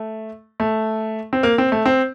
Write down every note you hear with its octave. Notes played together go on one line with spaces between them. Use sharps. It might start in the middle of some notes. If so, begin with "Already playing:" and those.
Already playing: A3
A3
C4
A#3
C4
A3
C4